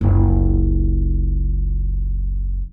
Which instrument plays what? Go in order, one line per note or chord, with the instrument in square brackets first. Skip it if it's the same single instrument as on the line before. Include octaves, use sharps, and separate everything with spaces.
[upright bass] F#1 C#2